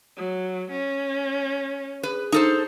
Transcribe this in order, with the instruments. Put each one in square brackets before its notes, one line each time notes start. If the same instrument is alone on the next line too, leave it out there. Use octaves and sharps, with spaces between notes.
[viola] F#3
C#4
[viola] G#4 [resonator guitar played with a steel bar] B4
[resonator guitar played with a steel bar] D#4 A4 C5